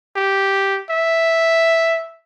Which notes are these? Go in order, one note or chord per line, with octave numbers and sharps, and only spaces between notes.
G4
E5